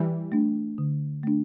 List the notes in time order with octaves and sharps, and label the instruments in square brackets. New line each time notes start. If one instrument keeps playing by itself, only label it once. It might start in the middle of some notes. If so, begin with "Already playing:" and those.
Already playing: [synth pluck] E3 G3
[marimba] A3 D4
D3
A3 D4